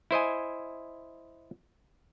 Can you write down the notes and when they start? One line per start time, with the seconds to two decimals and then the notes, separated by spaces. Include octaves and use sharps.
0.11 E4 C5 D#5 G#5